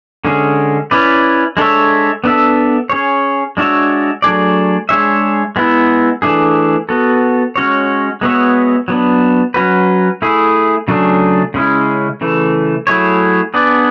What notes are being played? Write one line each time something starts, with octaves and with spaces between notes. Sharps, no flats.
D3 G#3 C#4 G#4
C#4 E4 B4 D5
G#3 D4 A4 C#5 E5
B3 D4 A4 E5
C#4 G#4 C#5
G#3 D4 F#4 C#5 E5
F#3 A3 D4 G#4 D5
G#3 D4 G#4 C#5 E5
G#3 B3 E4
E3 A3 D4 G#4
B3 F#4 A4
G#3 C#4 F#4 C#5
G#3 B3 F#4 C#5 E5
F#3 B3 D4
F#3 C#4 F#4 B4
A3 E4 G#4
C#3 F#3 A3 D4 G#4
C#3 G#3 C#4 E4
C#3 E3 A3
F#3 A3 E4 G#4 C#5
B3 D4 G#4 B4 D5